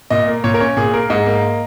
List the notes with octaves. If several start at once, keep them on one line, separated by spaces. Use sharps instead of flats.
A#2 D#5
A#3
A#2 C#5
A#4
C#4 C#5
A#2 G#4
A#3 A#4
G#2 D#5
A#3